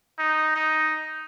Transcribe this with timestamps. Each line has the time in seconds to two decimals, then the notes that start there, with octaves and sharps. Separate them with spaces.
0.19 D#4
0.55 D#4